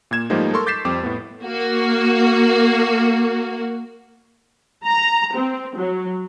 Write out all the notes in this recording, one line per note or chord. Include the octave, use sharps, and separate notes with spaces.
A#2 A#3 G#6 E7
G#2 F3 G3 A3 A#3 D#4
A4 A#4 C6 C#6
D6 G6 A6 B6 C7 E7
F2 G3 C4 G4 D6 E7
A2 B3
A#3 F#4
A#5
C4
F#3